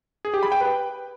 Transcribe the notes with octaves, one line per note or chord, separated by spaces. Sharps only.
G#4
G4
B5
G5
B4